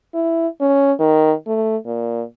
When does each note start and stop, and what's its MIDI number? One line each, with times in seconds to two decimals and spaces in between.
0.14 0.47 64
0.61 0.92 61
0.99 1.33 51
1.47 1.77 57
1.86 2.23 46